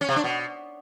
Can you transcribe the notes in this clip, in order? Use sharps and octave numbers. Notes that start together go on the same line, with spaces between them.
C#4
C3
D4
B2